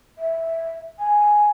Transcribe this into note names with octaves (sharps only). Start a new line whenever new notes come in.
E5
G#5